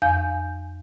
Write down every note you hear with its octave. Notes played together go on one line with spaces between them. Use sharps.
F2 F5 G#5 G6